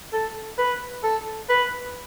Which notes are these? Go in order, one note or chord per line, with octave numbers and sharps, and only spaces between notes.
A4
B4
A4
B4